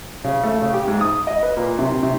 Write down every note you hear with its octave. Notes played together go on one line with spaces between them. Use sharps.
C#3
A3
C#3
G4
G#2
D#6
D#5
B4
A#2
C3
C3